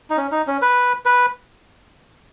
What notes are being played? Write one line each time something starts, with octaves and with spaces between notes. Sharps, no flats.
D#4
C#4
D#4
C#4
B4
B4